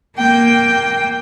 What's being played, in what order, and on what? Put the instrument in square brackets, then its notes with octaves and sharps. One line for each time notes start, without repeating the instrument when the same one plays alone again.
[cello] A#3 G5